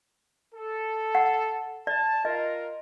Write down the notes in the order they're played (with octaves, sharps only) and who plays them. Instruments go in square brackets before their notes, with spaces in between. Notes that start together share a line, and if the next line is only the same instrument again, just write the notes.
[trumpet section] A4
[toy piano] F#5
[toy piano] D5 [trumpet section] A5
[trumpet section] F4 A#4 [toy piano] D#5